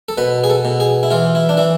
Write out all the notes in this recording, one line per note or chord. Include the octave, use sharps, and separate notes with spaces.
A4
B2 B4
G#4
A4
B2
G#4
E4
E3 F4
E4
D4
E3 E4